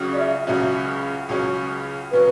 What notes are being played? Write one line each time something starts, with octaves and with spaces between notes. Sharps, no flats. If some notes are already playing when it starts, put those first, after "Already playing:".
Already playing: C#2 C#3 F#3 C#4 F#4
D5
E5
C#2 C#3 F#3 C#4 F#4
C#2 C#3 F#3 C#4 F#4
C#3 F#3 C#4 B4